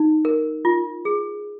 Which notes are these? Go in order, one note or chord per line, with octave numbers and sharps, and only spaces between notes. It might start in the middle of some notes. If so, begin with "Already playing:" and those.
Already playing: D#4
A#4
F4
G#4